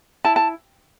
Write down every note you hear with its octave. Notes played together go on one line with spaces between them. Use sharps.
E4 A5
A5